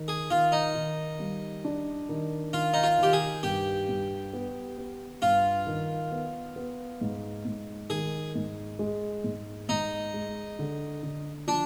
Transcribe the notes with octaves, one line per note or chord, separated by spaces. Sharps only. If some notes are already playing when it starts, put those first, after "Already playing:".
Already playing: D#3
G#4
D#3 F4
D#4
D#3
G3
D4
D#3
D#3 F4
D#4
F4
D#3 G4
G#4
G2 G4
G2
B3
B3
G2 F4
D#3
B3
B3
G#2
G#2
D#3 G#4
G#2
G#3
G#2
G#2 D#4
G#3
D3
D3
F3 D4